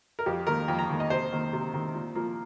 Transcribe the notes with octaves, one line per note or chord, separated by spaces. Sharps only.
A#4
F2 G4
D#3 A#3 A#4
F2 G5
A#5
D#3 A#3
D#5
C3 C5
D#3 A#3
C3
D#3 A#3
A#2
F3 A#3